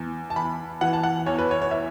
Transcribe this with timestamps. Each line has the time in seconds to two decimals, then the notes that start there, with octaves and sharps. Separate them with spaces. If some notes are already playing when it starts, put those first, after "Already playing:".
Already playing: E2
0.30 A5
0.36 E2 B5
0.81 E3 F#5
0.93 A5
1.03 F#5
1.26 E2 C#5
1.38 B4
1.51 C#5
1.62 C#5
1.71 E5